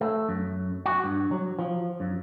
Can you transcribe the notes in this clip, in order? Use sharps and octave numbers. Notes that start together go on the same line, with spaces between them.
A3
F#2
F#4
G2
F#3
F3
F#2